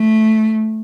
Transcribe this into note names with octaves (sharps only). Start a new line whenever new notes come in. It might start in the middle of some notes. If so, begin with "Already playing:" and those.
Already playing: A3